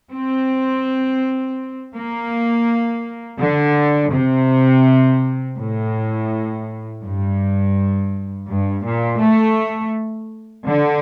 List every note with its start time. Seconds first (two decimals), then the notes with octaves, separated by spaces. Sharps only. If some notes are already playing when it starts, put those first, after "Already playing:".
0.12 C4
1.94 A#3
3.39 D3
4.13 C3
5.57 A2
7.02 G2
8.49 G2
8.85 A#2
9.21 A3
10.66 D3